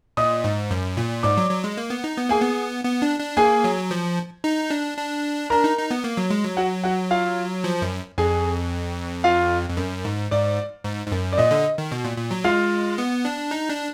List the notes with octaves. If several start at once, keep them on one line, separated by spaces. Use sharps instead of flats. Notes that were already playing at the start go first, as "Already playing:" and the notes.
A#2 D#5 D#6
G#2
F#2
A#2
G#2 D5 D6
F#3
F#3
G#3
A#3
B3
D#4
B3
A#3 G#4 G#5
B3
B3
D4
D4
A#3 G#4 G#5
F#3
F3
D#4
D4
D4
D4 A#4 A#5
D#4
D#4
B3
A#3
F#3
G#3
F#3
F#4 F#5
F#4 F#5
F4 F5
F3
F#2
F2 G#4 G#5
F4 F5
F2
F#2
G#2
G#2 D5
G#2
G#2
F#2
D5
A#2 D#5
D3
D#3
B2
A#2
A#2
F#3
G#3 F4 F5
B3
D4
D#4
D4